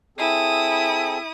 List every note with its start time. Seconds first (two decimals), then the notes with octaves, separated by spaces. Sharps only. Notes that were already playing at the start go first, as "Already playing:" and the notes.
0.18 C4 E4 G#4 A4 D#6